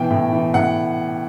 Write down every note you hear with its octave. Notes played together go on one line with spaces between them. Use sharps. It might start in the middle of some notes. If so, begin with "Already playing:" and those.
Already playing: B2 E3 G5
A2
E3
A2 F#5